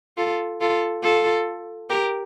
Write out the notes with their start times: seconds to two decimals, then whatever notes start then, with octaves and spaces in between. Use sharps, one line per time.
0.17 F4 A4
0.60 F4 A4
1.03 F4 A4
1.90 G4 A#4